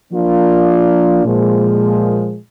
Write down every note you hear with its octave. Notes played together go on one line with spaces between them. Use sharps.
F3 A#3 D4 F4
A#2 F3 G#3